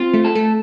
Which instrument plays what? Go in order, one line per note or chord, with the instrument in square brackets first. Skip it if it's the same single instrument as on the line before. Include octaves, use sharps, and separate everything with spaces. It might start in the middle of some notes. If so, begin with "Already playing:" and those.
Already playing: [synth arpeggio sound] C4 [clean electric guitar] F4
[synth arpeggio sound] A3
[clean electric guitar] A4
[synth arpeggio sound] A3